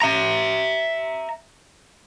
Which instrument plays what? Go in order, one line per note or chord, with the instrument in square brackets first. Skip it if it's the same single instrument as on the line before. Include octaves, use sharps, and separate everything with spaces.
[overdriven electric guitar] E5 A#5